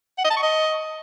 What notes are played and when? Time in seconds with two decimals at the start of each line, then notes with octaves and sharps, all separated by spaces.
0.18 F#5
0.24 D#5
0.30 A5
0.37 C#6
0.43 D#5